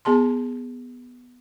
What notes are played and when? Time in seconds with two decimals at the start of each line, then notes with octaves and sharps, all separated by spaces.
0.05 B3 G#4 A5 C6